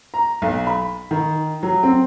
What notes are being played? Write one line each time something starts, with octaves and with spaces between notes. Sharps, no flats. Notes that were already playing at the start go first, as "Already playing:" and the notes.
A#5
B1
B5
D#3
F#3
C4